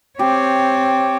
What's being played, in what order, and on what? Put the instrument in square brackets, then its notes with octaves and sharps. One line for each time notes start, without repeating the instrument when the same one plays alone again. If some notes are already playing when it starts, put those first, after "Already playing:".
[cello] C4 C#5 [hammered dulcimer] G4